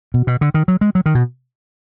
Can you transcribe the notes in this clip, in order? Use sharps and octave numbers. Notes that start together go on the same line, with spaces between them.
B2
B2
D3
D#3
F#3
G#3
F#3
D#3
B2